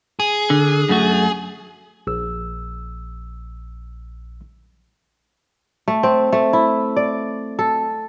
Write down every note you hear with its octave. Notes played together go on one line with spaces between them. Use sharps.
G#4
D3
F#2 A3 F#4
A#1 E6
A3
C4
A3
E4
D5
A4